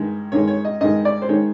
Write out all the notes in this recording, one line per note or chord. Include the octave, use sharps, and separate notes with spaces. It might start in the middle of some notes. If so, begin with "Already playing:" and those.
Already playing: G2 D#3 G#3
G2 D#3 G#3 C#5
C#5
D#5
G2 D#3 G#3 D#5
D5
C5
D#3 G#3 C#5